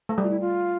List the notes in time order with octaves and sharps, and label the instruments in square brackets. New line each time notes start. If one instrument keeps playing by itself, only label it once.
[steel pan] A3
G3
[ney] F4
E4
F4